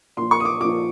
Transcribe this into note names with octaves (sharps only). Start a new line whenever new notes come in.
A#2 F3 C6
C#6
D#6
D6
A#2 F3 D6